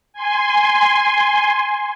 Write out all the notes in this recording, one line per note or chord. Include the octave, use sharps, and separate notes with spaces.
G#5 C6